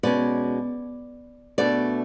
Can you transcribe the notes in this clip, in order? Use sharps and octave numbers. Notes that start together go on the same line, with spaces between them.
B2 G#3 C#4 D5
B2 A3 D4 D5